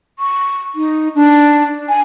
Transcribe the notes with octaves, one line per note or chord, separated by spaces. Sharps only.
C#6
D#4
D4
G#5